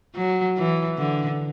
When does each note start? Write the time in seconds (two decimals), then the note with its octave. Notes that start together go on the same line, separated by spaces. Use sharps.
0.15 F#3
0.57 E3
0.97 D3